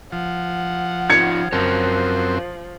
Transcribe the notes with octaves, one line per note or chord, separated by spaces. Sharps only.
F3 F#5
D#4 F4 C#5 G#6 C#7
F#2 F3 C4 A#4 C#5 A5